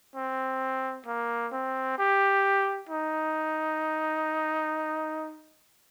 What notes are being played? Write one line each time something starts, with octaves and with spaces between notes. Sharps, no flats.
C4
A#3
C4
G4
D#4